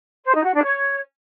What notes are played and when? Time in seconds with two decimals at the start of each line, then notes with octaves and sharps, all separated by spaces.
0.24 C5
0.34 D#4
0.44 F#4
0.54 D4
0.64 C#5